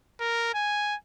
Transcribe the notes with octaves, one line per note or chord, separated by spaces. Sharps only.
A#4
G#5